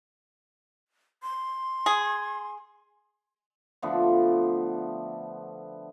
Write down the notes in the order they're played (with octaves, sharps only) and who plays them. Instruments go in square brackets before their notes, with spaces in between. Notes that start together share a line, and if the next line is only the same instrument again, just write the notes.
[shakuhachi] C6
[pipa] G#4
[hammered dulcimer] D3 F3 A3 B3